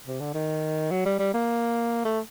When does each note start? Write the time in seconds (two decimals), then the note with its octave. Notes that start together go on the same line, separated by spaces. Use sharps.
0.07 C3
0.20 D3
0.34 D#3
0.91 F#3
1.06 G3
1.19 G3
1.34 A#3
2.05 A3